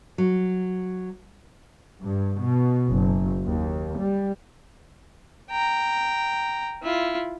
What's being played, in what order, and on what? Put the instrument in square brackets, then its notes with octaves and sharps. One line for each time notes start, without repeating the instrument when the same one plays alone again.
[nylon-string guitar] F#3
[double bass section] G2
B2
F#1
D#2
G3
[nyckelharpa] G5 A#5
E4 F4